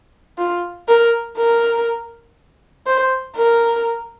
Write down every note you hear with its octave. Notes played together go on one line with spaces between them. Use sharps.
F4
A#4
A#4
C5
A#4